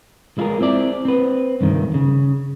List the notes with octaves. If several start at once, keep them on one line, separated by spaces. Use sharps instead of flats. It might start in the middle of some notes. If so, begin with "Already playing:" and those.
G#3 E4 F4 G#4 A#4
C4 E4 D5
C4 B4
C2 G2 D#3
C#3